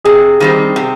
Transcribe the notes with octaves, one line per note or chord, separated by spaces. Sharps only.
C3 G#4
D#3 G3 C4 D#4
C3